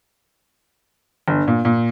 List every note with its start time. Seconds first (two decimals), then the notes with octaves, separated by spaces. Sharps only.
1.28 G1
1.48 A#2
1.65 A#2